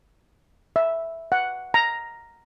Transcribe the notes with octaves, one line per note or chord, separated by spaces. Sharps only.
E5
F#5
A#5